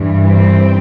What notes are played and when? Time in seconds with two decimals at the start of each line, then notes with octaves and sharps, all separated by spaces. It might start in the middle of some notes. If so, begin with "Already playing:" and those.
Already playing: G2 E3 G3
0.27 C4